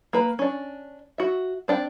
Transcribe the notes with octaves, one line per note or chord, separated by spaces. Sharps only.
A#3 B4 A#5
C#4 D4
F#4 E5
C4 D4 G5